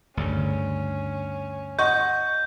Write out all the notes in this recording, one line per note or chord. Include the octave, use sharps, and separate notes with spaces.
D2 G2 C#3 C#4
D#5 F#5 C#6 G6